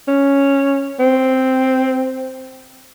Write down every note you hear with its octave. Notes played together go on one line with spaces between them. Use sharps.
C#4
C4